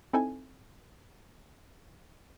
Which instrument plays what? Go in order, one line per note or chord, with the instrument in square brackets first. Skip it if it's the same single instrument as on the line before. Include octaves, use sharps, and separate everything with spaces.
[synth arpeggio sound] C4 D#4 E4 A4 G#5